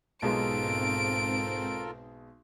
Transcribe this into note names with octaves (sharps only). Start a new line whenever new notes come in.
B1 G#2 G#3 C4 F4 A4 A#4 D7